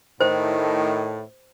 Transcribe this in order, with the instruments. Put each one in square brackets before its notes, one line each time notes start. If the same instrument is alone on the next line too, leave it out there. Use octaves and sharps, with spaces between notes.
[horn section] A2 [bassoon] D#3 [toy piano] C5